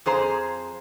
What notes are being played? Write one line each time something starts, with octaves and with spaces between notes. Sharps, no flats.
F2 G#4 C5 A#5